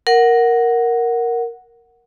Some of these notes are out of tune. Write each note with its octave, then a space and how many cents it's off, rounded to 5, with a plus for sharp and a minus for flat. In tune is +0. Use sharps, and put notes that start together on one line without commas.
A#4 +0 F#5 +0